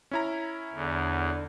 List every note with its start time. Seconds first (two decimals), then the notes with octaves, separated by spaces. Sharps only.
0.11 C#4 E4 A#5
0.74 E2 D3